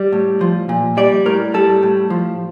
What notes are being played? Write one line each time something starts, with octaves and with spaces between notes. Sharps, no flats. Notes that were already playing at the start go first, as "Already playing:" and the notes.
Already playing: G3 D5
A2
F3
A#2
G3 D5
A2 A#4
G3 A4
A2
F3